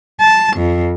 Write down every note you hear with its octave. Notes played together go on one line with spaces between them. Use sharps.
A5
F2